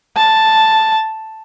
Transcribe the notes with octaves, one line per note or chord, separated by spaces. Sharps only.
A5